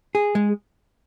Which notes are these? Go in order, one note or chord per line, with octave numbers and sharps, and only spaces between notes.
G#4
G#3